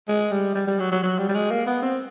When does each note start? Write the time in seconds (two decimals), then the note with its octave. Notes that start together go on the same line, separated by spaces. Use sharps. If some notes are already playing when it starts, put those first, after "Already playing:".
0.08 G#3
0.31 G3
0.55 G3
0.67 G3
0.79 F#3
0.92 F#3
1.03 F#3
1.18 G3
1.29 G3
1.35 G#3
1.51 A#3
1.66 B3
1.82 C4